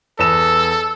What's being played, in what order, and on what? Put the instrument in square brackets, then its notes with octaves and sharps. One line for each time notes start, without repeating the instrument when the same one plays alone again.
[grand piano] E2 B3 E7 [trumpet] A4 [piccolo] E6